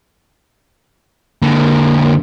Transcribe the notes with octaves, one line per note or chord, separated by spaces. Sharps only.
D3 A#3